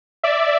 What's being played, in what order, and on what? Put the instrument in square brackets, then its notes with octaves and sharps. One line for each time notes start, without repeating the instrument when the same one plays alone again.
[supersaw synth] D5 E5